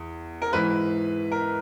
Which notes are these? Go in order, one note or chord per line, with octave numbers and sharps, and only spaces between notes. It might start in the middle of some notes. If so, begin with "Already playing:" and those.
Already playing: E2
A#4
G#2 E3 B4
A#4